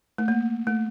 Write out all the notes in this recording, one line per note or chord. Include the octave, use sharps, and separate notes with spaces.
A3
A#3
A3